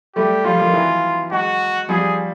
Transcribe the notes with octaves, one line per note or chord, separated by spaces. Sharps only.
G3 A3 G4
F3 G3 F4
D#3 F3
E3 F#3
F#3 G#3 F#4
F3 G3 G#4